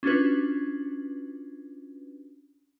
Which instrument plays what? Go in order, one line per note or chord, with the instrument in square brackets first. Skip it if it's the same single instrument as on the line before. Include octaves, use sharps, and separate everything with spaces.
[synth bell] C#4 D4 F4 F#4 B4